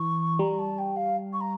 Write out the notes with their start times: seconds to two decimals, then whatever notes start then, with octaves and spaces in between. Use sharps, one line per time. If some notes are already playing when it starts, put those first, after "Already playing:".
Already playing: E3 C#6
0.39 G3 A#5
0.58 A5
0.78 G5
0.96 F5
1.32 C#6
1.40 A#5